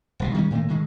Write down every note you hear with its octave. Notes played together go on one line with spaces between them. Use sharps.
D#1 C#2 B2
D#3 G3 B3 C#4
A2 D#3 A3 A#3
D3 D#3 G#3